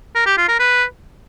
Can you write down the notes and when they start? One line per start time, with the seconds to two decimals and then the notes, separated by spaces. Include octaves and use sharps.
0.15 A#4
0.26 G4
0.37 F4
0.49 A#4
0.60 B4